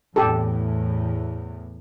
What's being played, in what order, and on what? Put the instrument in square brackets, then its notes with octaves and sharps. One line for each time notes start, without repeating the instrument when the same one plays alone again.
[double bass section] E2 A2 [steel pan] G4 A4